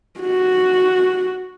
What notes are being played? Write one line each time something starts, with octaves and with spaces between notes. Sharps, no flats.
F#4